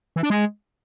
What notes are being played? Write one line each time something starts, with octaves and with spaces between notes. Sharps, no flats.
E3
D4
G#3